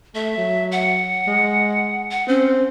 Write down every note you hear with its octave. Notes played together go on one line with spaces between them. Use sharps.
A3 E5
F#3
F#5
G#3
F#5
C4 C#4